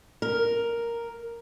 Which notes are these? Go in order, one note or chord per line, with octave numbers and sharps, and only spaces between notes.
A#4